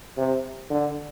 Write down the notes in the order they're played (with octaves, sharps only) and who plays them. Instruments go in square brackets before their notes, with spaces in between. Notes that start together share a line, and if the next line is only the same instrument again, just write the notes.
[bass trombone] C3
D3